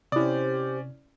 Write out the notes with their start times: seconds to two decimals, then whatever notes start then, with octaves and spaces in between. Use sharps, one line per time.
0.12 C3 C#4 E4 G4 C5 D5 D#6